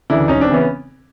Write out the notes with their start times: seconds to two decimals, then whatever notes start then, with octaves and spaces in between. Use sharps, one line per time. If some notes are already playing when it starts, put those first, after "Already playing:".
0.10 D2 C#3 E3 D4 E4
0.28 E1 C#4 D#4
0.41 C4 D4
0.49 C#3 E3 B3 C#4